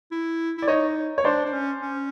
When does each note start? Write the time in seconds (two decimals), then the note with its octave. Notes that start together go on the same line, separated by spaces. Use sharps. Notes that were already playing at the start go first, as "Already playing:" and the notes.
0.12 E4
0.58 E4 D5
0.67 D#4 C#5 D#5
1.18 C#5
1.24 D4 C5 D5
1.46 D4
1.53 C#4
1.82 C#4